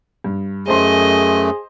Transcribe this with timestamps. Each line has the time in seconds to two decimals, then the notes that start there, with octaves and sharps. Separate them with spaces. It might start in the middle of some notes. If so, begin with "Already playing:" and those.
0.24 G2
0.67 F#2 A3 G#4 C5 D#5 C6